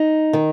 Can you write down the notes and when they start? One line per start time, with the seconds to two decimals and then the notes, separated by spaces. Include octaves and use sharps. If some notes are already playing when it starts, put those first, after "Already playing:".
Already playing: D#4
0.33 D#3